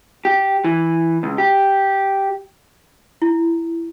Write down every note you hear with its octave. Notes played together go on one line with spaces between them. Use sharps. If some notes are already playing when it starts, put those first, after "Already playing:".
G4
E3
C#2
G4
E4